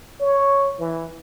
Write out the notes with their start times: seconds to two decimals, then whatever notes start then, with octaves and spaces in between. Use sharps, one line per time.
0.20 C#5
0.79 E3